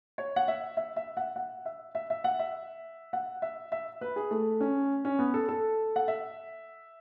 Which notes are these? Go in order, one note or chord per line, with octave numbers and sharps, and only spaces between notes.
C#5
F#5
E5
E5
E5
F#5
F#5
E5
E5
E5
F#5
E5
F#5
E5
E5
B4
G#4
A3
C#4
C#4
B3
A4
A4
F#5
E5